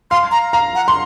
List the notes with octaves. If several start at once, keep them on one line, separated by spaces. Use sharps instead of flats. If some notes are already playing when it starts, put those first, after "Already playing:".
F5 C6
A#5
F5 A#5
F#5
C6